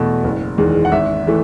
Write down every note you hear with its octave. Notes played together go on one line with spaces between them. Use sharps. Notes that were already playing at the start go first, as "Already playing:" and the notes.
Already playing: E2 B2 A3
F#1
E2 D#3 G#3
F#5
G#1 E5
E3 A3